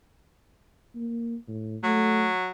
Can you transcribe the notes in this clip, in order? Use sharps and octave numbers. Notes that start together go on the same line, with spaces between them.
A#3
A2
F#3 A3